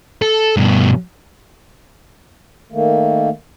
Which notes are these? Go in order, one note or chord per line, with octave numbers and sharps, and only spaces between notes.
A4
G2 B2
D#3 A3 A#3